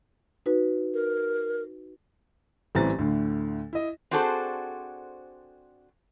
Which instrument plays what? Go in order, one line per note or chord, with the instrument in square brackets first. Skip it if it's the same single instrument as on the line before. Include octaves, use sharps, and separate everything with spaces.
[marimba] D#4 F#4 B4
[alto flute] A#4
[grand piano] A1 E3 G3 C4 A#5 A6
D2 A2 D3
E4 D#5
[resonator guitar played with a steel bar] C4 D4 F#4 G#4 A4 C5